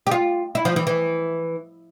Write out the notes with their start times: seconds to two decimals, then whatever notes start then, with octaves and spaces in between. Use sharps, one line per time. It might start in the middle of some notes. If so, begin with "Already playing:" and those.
0.07 G4
0.11 F4
0.55 E4
0.65 F3
0.76 E3
0.87 E3